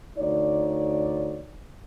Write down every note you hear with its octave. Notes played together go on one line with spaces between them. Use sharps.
D2 D#4 C#5 D5